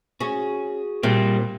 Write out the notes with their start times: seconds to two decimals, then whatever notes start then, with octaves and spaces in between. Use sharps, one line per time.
0.21 C#4 F#4 G#4
1.03 A#2 G3 C4